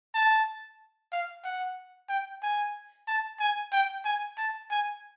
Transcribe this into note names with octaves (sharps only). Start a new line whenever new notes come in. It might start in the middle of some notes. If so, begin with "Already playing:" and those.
A5
F5
F#5
G5
G#5
A5
G#5
G5
G#5
A5
G#5